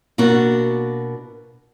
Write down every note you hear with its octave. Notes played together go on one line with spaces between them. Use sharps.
B2 A#3 D4 F#4